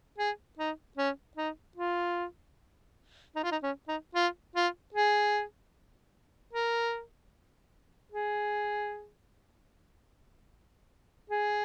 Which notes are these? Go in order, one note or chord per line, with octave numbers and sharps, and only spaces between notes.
G#4
D#4
C#4
D#4
F4
D#4
F4
D#4
C#4
D#4
F4
F4
G#4
A#4
G#4
G#4